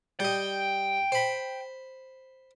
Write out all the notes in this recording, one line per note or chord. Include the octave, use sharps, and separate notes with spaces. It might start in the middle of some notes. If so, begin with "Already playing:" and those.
G3 D#5 G5
C5 B5